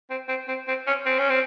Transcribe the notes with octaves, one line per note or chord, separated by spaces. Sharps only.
C4
C4
C4
C4
C#4
C4
C#4
C4